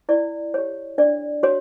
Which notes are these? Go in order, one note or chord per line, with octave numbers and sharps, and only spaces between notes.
E4 D5
G4 C#5
D4 D5
F#4 C#5